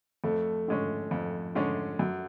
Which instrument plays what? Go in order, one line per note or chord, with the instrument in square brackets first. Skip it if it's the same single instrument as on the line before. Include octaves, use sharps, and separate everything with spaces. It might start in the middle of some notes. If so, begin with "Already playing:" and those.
[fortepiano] F2 [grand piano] A3
[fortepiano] D3 G#3 C#4
F2
D3 G#3 C#4
F#2